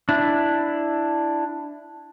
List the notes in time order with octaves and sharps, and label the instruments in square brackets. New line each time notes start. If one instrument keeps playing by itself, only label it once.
[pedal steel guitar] D4 E4